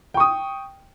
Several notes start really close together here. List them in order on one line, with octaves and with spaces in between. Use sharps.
G5 C#6 D#6